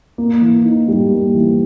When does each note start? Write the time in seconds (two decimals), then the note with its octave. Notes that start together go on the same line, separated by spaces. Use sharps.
0.18 A#3
0.41 E3
0.65 D#4
0.88 G3
1.10 A#3
1.34 E3